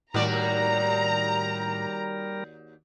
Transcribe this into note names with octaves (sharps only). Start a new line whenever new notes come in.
D#2 A2 G3 F#4 A#4 D5 A#5